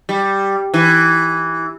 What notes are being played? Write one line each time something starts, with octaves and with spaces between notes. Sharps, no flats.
G3
E3